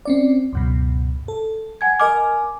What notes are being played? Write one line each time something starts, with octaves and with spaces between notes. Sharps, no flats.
C4 C#4 D5
C#2 F#2 B2
A4
F#5 G#5 G#6
A#4 D#5 G#5 D6 F6